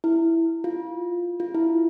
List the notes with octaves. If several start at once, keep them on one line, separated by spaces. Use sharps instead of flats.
E4
F4
F4
E4